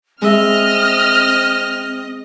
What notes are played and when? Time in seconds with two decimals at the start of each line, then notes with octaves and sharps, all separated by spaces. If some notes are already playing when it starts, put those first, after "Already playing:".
0.22 G#3 C4 D#5 E5 F6